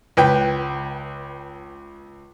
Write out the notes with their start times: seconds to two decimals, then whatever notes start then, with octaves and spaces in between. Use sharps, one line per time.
0.17 C#2 B4 G5